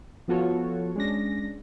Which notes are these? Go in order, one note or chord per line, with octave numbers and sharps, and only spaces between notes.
F3 B3 F4 F#4 A4 C#5
G#3 C#4 D4 A#6